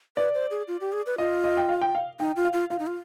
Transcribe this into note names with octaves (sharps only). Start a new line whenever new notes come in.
B4 D5
C5
G#4
F4
G4
G#4
B4
F4 D#5
D#5
G5
F5
G5
F5
D#4 G5
F4
F5
F4
F4 F5
D#4
F4